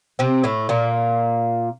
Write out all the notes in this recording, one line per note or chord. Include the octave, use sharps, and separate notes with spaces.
C3 C4
A2 A3
A#2 A#3